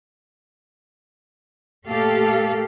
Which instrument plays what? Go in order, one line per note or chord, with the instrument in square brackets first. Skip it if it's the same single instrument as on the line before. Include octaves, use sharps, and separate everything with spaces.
[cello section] A#2 A3 G4 A4 F5